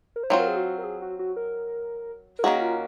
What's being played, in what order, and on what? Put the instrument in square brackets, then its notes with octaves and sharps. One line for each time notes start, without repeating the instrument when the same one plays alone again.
[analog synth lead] A#4
C5
[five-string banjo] F#3 C4 F4 [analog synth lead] C#5
[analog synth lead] A#4
G#4
F#4
A#4
G#4
F#4
F#4
A#4
A#4
[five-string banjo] D#3 A#3 C#4 F#4 [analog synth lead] G#4
[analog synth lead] F4